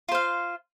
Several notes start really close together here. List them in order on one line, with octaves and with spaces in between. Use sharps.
F4 C5 F5